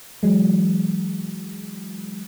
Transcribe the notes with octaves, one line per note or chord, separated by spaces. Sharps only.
E3 F#3 G#3